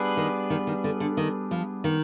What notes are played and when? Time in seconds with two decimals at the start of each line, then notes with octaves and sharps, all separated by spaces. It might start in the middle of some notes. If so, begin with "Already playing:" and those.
Already playing: G3 B3 D4 G#4 B4
0.17 D#3
0.50 D#3
0.67 D#3
0.84 D3
1.00 D3
1.17 D#3
1.51 F3
1.84 D#3